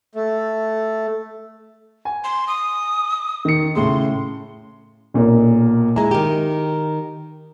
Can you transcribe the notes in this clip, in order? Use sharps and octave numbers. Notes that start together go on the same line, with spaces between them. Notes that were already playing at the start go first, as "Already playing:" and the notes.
A3
G#5
C6
D#6
D#3 C#7
A2 C#3 C6
B1 A#2 A#4
G#3 E4 A#5
D#3 G4